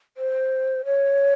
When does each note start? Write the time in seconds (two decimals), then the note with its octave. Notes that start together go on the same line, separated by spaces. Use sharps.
0.17 C5
0.85 C#5